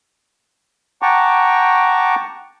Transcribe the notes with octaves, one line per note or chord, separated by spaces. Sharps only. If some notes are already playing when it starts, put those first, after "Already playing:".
F#5 G5 A5 A#5 C#6 D6